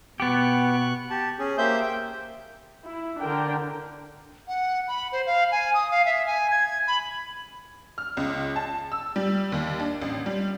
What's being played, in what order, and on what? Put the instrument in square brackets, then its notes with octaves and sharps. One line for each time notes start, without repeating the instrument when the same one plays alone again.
[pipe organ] B2 C#6 F#6 [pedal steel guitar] B3 G4
[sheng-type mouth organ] G4 A5
C#4 G#4
A#3 G4 C5 E5 G6
G5
[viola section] E4
D3 D4 A#4 G5
[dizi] F#5
B5
C5
F5
G#5
D#6
F5
E5
G#5
G#6
B5
[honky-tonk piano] F6
C#2
A5
E6
G3
D#2
D4
A1
G3